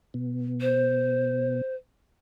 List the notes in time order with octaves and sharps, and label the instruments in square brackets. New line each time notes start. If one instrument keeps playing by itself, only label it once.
[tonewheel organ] B2
[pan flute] C5